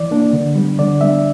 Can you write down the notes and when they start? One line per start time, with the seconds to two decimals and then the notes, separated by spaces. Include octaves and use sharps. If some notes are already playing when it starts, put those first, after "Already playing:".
Already playing: E3 D5
0.11 A#3 D4
0.33 D3
0.56 G3 B3 D4
0.79 D3 D5
1.01 G3 B3 D4 E5